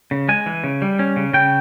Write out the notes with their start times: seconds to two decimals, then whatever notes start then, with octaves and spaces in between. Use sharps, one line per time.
0.11 C#3
0.29 G#3 G#5
0.46 E3
0.64 C#3
0.82 G3
0.99 C#4
1.16 C#3
1.33 C#3 G5